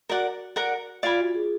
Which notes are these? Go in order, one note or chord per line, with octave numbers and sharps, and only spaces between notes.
F#4 A#4 D5 F#5
A#4 D5 F#5
F4 D5 F5 G#5 B5
F#4
G#4